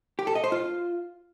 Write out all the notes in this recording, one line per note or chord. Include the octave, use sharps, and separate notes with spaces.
G4
A4
D#5
C5
F4